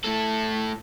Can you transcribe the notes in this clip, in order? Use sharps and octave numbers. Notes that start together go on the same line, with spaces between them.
A2 A4